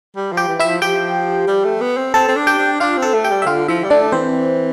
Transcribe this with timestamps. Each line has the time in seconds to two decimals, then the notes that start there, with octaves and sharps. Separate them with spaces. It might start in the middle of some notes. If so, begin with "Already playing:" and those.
0.16 G3
0.32 F3
0.37 G4 G5
0.48 E3
0.59 E4 E5
0.65 F3
0.81 F3 G4 G5
1.47 G3
1.64 A3
1.81 B3
1.97 C4
2.14 C4 A4 A5
2.28 C4
2.36 D4
2.47 G4 G5
2.58 D4
2.80 D4 F4 F5
2.97 C4
3.02 A4 A5
3.14 A3
3.24 G4 G5
3.31 G3
3.42 E5
3.46 D3 F4 F5
3.68 F3 E4 E5
3.84 G3
3.90 A3 D4 D5
4.12 E3 C4 C5